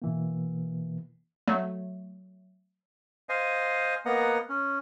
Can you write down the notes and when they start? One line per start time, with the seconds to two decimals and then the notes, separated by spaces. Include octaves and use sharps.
0.02 B2 E3 A#3
1.48 F#3 A3
3.29 C5 D#5 F5 G#5
4.06 A#3 B3 D#5 F#5 A#5
4.49 C#4